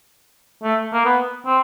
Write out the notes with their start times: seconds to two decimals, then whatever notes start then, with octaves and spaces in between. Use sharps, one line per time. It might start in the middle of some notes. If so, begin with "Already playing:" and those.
0.63 A3
0.93 A#3
1.05 B3
1.46 C4